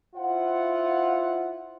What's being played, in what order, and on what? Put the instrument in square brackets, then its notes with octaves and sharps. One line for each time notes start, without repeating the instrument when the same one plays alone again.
[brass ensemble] E4 F4 C5 F#5